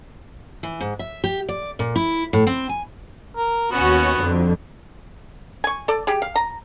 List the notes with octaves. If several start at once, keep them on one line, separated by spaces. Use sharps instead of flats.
E3
G#2
E5
G4
D5
A#2
E4
A2
C4
G#5
A#4
D#2 B3 C#4 F#4
F2 D3
G#5 C#6
A4 D5
G4 G#4
F5
A#5